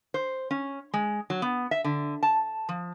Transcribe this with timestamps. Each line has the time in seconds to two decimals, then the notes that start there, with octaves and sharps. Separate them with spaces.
0.14 C5
0.51 C#4
0.94 G#3
1.30 F#3
1.42 B3
1.71 E5
1.84 D3
2.23 A5
2.69 F3